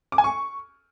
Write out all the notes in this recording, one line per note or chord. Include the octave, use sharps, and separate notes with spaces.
D6
G#5
C#6